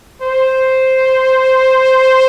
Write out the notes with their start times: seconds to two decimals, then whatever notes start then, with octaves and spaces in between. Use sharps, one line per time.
0.22 C5